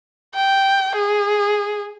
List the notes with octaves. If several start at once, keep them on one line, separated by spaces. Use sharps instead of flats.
G5
G#4